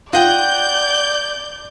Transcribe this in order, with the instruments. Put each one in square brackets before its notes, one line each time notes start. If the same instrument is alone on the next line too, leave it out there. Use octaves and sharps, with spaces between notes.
[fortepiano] F4 [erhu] D5 [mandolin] D#5 F#5 G5 [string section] G6